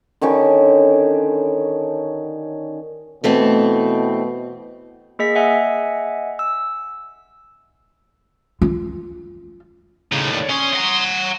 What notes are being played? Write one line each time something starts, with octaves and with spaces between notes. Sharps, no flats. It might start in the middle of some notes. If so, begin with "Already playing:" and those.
D3 D#3 C#4 G4
B2 E3 A3 C4
A#3 G#4 D#5 B6
D#5 E5 F#5 G#5
E6
F4
D#2 A2 C#3 A#5
C#5 D5
C#4 C6 D#6
F#5 A#5